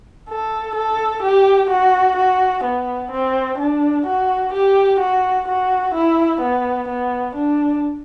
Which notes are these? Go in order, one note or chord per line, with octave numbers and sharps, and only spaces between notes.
A4
A4
G4
F#4
F#4
B3
C4
D4
F#4
G4
F#4
F#4
E4
B3
B3
D4